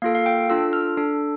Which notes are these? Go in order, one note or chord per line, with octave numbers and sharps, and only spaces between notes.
A#3 F4 A4 F5
F5
G5
D4 F4 A4 E6
F6
D4 A4